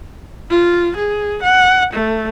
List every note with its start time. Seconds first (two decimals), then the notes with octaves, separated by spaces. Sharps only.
0.51 F4
0.96 G#4
1.43 F#5
1.93 A3